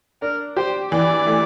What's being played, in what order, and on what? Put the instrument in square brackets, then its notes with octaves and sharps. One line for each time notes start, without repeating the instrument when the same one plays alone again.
[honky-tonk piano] D4 [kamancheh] A#4
[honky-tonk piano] G4 [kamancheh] C5
[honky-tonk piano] E3 [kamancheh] D5
[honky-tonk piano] A3